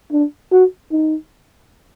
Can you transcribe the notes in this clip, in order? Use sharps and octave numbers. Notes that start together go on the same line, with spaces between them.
D4
F#4
D#4